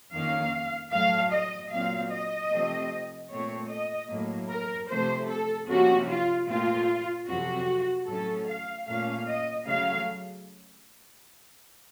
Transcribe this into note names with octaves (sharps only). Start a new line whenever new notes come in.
F2 D#3 A#3 C#4 F5
A2 F#3 A3 F5
D#5
A#2 F#3 C4 F5
D#5
C3 F3 A3 C4
A#2 A3 C4 C#5
D#5
A2 F#3 A#3
A#4
C3 F3 A3 C5
A4
C3 F3 A#3 C#4 F#4
F4
A#2 A3 C4 F4
F2 C3 F#3 C4 F#4
A2 F#3 A3 C#4 A4
F5
A#2 A3 C#4 F5
D#5
C#3 F#3 A3 F5